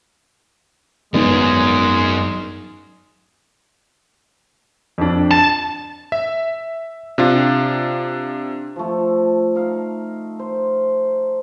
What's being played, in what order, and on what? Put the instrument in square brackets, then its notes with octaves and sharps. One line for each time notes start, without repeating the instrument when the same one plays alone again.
[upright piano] G#1 B3 [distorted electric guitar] F#2 [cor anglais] G#3
[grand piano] F2 D4
[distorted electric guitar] A5 [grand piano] A6
[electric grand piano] E5
C3 D4 F4
[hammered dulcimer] F3 A3
D#4 F5
C5